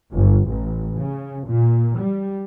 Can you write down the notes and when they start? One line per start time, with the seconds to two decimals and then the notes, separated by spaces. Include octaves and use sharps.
0.12 G1
0.47 A1
0.97 C#3
1.46 A#2
1.99 G3